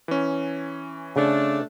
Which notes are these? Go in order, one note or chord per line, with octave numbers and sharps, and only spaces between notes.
E3 C#4
C#3 A3 D4